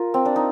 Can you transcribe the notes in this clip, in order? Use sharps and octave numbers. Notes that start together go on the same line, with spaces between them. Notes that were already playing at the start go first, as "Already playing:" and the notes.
Already playing: F4 A#4
C4
D4
D#4